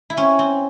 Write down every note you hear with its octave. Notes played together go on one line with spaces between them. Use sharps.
E4
C4 C#4
C4